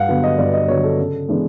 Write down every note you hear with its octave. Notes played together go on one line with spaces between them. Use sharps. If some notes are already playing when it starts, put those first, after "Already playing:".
Already playing: G2 F5 F#5
D3 F#3 B3
D#5
G2 D5
D#5
D3 F#3 B3 C#5
A4
C#3
E3 G#3 B3 D4